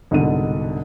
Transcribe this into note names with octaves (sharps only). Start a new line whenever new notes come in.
C2 G#2 B2 D3 F#5 D#7